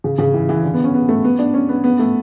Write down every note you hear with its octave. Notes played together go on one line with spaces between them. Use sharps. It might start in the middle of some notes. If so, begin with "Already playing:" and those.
C#3
C#3
E3
E3
D3
B3
C#4
B3
A3
B3
D4
C#4
B3
B3
A3